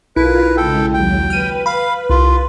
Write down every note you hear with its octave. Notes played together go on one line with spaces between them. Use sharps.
B1 E4 F4 A#4 B4
C#3 G#3 A4 G5
D#2 F#3 G5
B4 F6 D#7
F5 B5
C2 F4